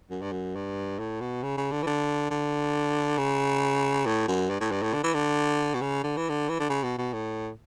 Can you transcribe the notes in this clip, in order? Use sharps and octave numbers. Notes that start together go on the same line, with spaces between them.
F#2
G2
F#2
G2
A2
B2
C#3
C#3
D3
E3
D3
D3
C#3
A2
F#2
G2
A2
G2
A2
D3
E3
D3
B2
C#3
D3
E3
D3
E3
D3
C#3
B2
B2
A2